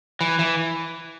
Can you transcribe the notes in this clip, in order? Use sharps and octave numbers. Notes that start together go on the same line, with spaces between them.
E3
E3